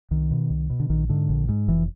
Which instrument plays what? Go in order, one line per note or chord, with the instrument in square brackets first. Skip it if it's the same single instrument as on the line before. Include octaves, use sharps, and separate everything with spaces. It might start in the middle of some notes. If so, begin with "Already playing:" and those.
[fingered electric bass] C2 D#3
B2
C2
B2
D3
A#1 D#3
G#2 D3
A#1
G#2
F1 E3